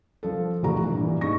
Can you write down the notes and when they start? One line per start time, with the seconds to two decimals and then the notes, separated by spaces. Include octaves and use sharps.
0.23 F3 A4
0.63 E1 A2 F#4 A#5
0.84 G2 A#2 E3
1.21 G#2 G#3 C#6 A#6